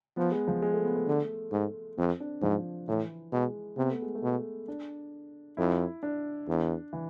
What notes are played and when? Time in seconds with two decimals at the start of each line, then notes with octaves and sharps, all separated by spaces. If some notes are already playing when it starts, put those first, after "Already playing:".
0.17 F3 B3
0.32 G#3
0.48 F3
0.62 G#3
0.74 A3
0.85 B3
0.96 A3
1.07 D3
1.52 G#2
1.97 F2 C4
2.20 D4
2.42 G#2 F3
2.88 A2 E3
3.32 B2 G#3
3.77 C3 B3
3.90 A3
4.02 G#3
4.15 A3
4.23 B2
4.68 D4
5.57 F2 E4
6.03 D4
6.48 E2
6.93 E3